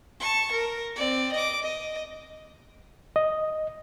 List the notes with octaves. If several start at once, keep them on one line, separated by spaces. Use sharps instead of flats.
A5 C#6
A#4
C4 D5
D#5 D6
D#5
D#5